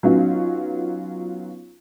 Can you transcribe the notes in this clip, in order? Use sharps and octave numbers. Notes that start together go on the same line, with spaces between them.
F#3 B3 C#4 D#4 F4